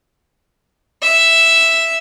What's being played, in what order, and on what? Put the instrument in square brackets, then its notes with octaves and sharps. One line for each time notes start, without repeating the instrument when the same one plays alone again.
[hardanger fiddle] E5